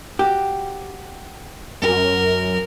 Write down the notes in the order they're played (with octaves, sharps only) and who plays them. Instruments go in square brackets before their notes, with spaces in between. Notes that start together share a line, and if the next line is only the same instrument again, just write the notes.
[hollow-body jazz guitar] F#4 G4
[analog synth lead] F#2 [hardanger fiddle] A#4